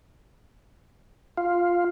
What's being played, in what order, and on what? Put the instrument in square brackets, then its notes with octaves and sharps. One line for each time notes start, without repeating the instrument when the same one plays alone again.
[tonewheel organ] F4